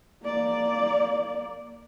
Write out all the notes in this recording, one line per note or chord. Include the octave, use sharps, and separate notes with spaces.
A#3 D5